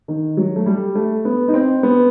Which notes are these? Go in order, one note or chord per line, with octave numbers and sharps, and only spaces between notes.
D#3
F#3
A3
G3
A3
B3
D#4
C4
B3